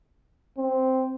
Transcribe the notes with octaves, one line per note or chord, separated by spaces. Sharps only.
C4